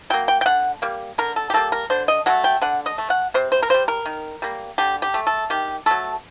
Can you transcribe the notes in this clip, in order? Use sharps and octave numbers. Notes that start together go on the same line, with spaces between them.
F#3 A#3 G5
G5
G5
D3 F#5
G3 A#3
D3 A#4
A4
G4
G3 A#3 A4
A#4
D3 C5
D#5
F#3 A3 F#5
G5
D3 F#5
D#5
A3
F#5
C3 C5
C5
A#4
G3 A#3 C5
A#4
D#3
G3 A#3
D3 G4
G4
A3
A4
D#3 G4
F#3 A3 A4